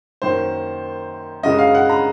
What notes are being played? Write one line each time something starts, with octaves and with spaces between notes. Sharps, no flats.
F#2 D#3 A#3 C5
F#2 C#3 G#3 D#5
F5
F#5
A#5